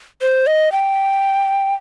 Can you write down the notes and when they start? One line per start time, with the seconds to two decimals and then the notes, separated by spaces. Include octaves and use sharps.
0.21 C5
0.47 D#5
0.72 G5